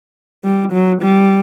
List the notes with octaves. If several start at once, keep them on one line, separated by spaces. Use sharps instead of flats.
G3
F#3
G3